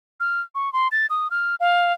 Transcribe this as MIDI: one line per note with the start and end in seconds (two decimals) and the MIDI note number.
0.20 0.41 89
0.55 0.72 85
0.73 0.88 84
0.92 1.06 93
1.10 1.28 87
1.31 1.55 89
1.60 1.93 77